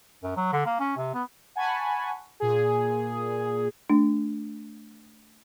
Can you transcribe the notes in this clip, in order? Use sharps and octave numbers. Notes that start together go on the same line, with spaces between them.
F#2
F#3
D3
A#3
C#4
C3
B3
F#5 G#5 A5 B5 C#6
A#2 G#4
A3 D4